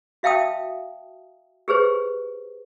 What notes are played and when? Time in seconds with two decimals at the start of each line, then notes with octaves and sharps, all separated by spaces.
0.23 F#4 E5 F5 G5 A5 D#6
1.68 G4 G#4 B4 C5